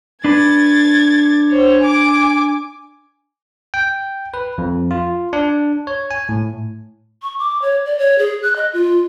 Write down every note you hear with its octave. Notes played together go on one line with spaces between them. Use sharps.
D4 B4 G#6 A6
C5 C#5
G#5 D6
G5
B4
F2
F4
D4
C#5
G#5
A2
C#6
D6
C#5
D5
C#5
G#4
F#6
D#5
F4